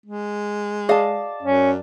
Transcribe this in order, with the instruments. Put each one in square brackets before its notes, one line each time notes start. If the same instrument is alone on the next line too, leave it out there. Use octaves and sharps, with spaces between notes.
[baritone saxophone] G#3
[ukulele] G#4 D#5 F5 [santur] D5 A5
[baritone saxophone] F#2 [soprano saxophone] C#4